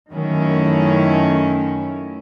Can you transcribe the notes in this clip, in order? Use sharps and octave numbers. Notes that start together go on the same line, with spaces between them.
F#2 D#3 A3 C#4 E4